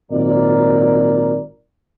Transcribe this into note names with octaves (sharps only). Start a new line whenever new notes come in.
G#1 A#2 F#3 A#4 D5